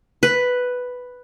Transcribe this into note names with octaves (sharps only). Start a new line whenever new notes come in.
B4